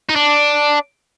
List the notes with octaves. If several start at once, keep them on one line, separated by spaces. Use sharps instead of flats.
D#4
D4